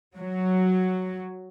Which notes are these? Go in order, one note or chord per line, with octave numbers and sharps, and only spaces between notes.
F#3